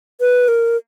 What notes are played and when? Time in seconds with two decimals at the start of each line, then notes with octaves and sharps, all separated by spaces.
0.21 B4
0.48 A#4